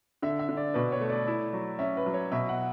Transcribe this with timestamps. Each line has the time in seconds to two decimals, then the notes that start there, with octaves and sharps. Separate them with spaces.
0.22 D3 E5
0.39 E5
0.49 D3
0.57 D5
0.74 B2 B4
0.92 C#5
1.01 A3
1.10 D5
1.28 E4
1.53 F#3
1.79 C#4 E5
1.97 B4
2.06 F#3
2.14 C#5
2.32 B2 E5
2.49 F#5